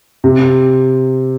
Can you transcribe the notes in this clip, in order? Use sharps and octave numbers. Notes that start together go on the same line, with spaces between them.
C3